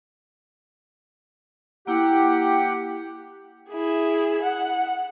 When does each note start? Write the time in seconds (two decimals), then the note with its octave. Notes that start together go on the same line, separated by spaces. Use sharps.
1.87 A#3 E4 G4 F#5
3.70 E4 G#4
4.42 F#5